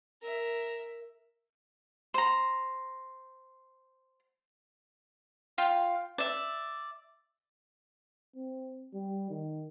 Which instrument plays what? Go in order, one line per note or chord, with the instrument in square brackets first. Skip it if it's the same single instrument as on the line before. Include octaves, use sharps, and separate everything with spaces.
[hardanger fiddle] A#4 E5
[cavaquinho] C5 A#5
F4 F5 G5
D5 E5
[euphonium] C4
G3
D#3